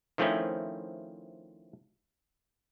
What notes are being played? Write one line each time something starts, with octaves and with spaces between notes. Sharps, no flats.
D#3 F3 A3 C4 C#4 E4